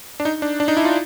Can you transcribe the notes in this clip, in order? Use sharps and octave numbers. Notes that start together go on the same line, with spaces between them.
D4
D#4
D4
D4
D#4
E4
F4